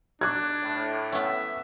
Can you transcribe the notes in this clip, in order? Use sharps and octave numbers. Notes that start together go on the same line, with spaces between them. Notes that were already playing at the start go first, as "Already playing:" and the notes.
D4 D6 F#6 G#6
A2
B3 C#4 E5